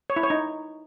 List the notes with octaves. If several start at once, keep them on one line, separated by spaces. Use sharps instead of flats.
C#5
E4
C#5
D#4